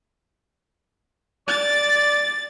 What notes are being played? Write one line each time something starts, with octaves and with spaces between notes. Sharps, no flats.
D5 A6